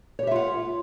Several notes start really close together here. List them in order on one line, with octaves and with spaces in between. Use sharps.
C#5 G4 E5 F4 F#5